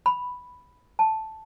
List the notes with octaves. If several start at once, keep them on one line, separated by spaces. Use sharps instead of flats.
B5
A5